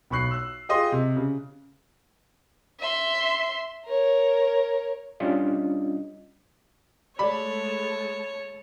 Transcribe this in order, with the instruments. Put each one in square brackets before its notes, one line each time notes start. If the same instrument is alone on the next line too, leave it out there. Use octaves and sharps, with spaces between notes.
[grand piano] B1 B5 C#6 F#6 C7
E6 F#6
F4 G4 G#4 D#5 C6
C3
C#3
[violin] E5 C6
A#4 C#5
[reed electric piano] G3 C#4 D4 F4 D#5
[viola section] G#3 A3 A5 [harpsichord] G4 D5 [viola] C#5 [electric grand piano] B5